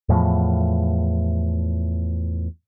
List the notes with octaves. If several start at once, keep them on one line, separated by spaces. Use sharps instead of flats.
E2 A2 F3